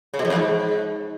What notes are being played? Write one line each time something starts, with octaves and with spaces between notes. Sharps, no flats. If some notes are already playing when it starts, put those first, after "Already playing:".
C#3
B2
F2
E2
G#2